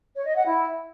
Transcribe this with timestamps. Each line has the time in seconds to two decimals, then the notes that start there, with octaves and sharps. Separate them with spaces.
0.15 C#5
0.26 D#5
0.36 F#5
0.46 E4